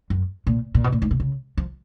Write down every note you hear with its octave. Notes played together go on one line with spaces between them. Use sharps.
F#2
A#2
A#2
B2
A#2
G#2
B2
C#3
F3